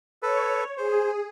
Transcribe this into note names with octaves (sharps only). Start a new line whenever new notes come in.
A4 B4 C#5
G#4 C5